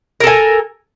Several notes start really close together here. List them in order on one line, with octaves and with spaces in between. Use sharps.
A#4 A4 G#5